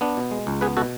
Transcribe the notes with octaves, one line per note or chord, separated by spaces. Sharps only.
B3 D4
B2
G#3
C#2
B3 G#4 B4
B2 F#4 A4